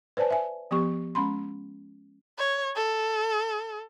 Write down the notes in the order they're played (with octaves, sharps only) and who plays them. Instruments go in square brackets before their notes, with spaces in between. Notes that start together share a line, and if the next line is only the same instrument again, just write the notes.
[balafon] B4 C5 D5 G#5 A5
E5 G#5
F3 B3 G4 C#6
G#3 C#4 B5 C6
[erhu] C#5
A4